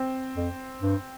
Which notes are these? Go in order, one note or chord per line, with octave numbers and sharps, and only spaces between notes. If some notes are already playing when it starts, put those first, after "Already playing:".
Already playing: C4
F2
G2